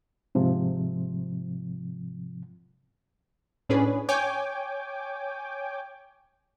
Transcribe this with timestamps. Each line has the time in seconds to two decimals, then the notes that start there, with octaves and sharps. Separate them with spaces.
0.35 G#2 C3 F3
3.69 A2 C#4 D4 G#4 B4
4.09 C#5 G5 G#5 D6